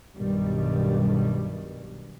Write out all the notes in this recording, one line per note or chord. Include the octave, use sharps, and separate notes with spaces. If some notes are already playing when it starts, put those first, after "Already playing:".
B1 G2 B2 D#3 G3